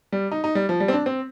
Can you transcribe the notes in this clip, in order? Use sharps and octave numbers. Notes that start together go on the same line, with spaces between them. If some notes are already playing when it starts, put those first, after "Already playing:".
G3
D#4
D#4
G3
F3
G3
C4
D4
C4